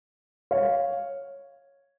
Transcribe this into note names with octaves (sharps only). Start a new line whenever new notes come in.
C#5 F5